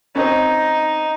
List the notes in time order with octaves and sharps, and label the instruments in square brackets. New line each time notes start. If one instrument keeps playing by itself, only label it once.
[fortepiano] C4 C#4 [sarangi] D#4